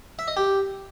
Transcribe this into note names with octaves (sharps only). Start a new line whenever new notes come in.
E5
D#5
G4